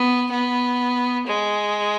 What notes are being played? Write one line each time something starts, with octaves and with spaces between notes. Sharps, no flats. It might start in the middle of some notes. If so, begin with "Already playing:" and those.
Already playing: B3
B3
G#3